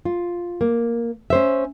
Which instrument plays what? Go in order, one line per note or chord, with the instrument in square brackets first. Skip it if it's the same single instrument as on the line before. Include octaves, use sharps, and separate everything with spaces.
[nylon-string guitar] F4
A#3
C#4 C5 E5